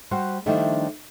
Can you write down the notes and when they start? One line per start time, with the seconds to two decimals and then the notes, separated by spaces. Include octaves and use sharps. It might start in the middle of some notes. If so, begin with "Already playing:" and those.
0.11 G3 F#4 C5 F#5
0.46 D#3 F3 G3 A3 D4 E4